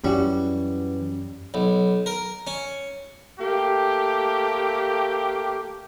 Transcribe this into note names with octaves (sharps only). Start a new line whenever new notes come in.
F#2 E3 G3 C#4 F#4
B1
A#4
C#4
A3 A#3 G4